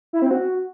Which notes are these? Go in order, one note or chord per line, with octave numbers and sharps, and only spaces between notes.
E4
C4
F#4